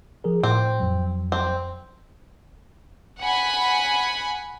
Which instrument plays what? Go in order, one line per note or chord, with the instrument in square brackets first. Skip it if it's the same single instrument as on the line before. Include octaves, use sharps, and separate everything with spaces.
[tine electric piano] F3 G#4 A#4
[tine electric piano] A2 [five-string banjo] C4
[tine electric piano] F2 F#3
[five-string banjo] C4
[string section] F#5 G#5 B5